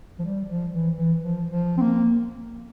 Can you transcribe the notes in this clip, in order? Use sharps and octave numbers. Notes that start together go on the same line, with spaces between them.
F3
G3
F3
E3
E3
F3
F3
C4
A#3